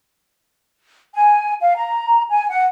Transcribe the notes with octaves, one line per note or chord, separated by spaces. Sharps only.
G#5
F5
A#5
G#5
F#5